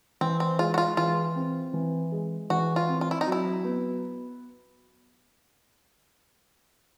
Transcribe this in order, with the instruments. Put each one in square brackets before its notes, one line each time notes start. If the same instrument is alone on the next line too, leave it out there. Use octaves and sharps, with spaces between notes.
[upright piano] E3 [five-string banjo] C4
[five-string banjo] C4
[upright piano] G#3 [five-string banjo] F4
[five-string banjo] F#4
F4
[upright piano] E3 [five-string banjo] F4
[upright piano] C4
E3
G#3
[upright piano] E3 [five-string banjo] F#4
[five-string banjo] F4
[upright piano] C4
[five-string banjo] F4
E4
D#4
[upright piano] F#3
[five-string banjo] E4
[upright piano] B3